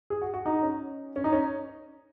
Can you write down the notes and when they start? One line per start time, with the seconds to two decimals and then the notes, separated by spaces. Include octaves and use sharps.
0.10 G#4
0.22 F#4
0.34 F#4
0.46 D#4
0.63 C#4
1.16 C#4
1.24 D#4
1.33 C#4